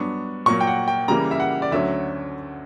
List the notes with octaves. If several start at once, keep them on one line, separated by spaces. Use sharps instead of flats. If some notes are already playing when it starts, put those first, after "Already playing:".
Already playing: G2 F#3 B3 D4 C#6
A#2 F#3 A#3 C#6
G5
F#5
G5
C#3 E3 G3 A#3 A#5
E5
F#5
D5
D2 D3 F#3 C#4 E5